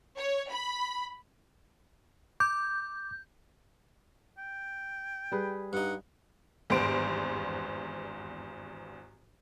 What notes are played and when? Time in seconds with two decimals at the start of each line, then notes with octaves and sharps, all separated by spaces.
0.18 C#5
0.50 B5
2.40 D6 G6
4.38 G5
5.32 G3 G#4 B4
5.73 G2 D#4 F#5
6.70 G#1 E2 G2 B3 C5 D7